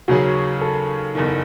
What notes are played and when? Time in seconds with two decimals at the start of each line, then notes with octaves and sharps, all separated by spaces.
0.08 D#2 C#3 F#3 C#4 F#4 G#4
0.62 A4
1.15 F#1 E2 D#3